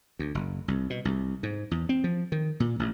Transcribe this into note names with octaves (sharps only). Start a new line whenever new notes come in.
D2
F#1
C2
B2
C2
G#2
E2
C4
F3
D#3
A#2
A1